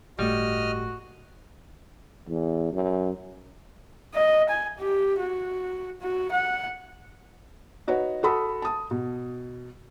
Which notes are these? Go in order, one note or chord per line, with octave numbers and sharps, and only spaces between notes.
G1 A2 G3 A3 F#4 D#5 F6
E2
F#2
D#5
G#5
G4
F#4
F#4
F#5
D#4 F#4 B4 C#5
F#4 A4 B5 D#6
A5 D#6
B2